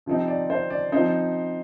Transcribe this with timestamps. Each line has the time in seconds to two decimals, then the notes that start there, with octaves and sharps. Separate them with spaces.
0.06 C3 F3 C4 D#4
0.28 D5
0.50 C5
0.70 D5
0.92 F3 C4 D#4 C5